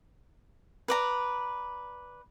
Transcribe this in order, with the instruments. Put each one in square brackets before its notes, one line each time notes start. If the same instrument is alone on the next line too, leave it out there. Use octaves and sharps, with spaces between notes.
[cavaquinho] B4 D5 A#5